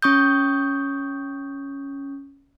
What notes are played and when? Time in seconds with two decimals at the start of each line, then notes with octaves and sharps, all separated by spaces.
0.02 C#4 C#6 D#6 G6